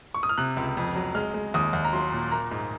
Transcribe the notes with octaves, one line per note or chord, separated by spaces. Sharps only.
C#6
D#6
F6
C3 F#6
C#2
F2
F#3
G#3 F6
G#3
D#2 D#6
D#2
A#5
F#3 C6
A#2
A#3 A#5
G#2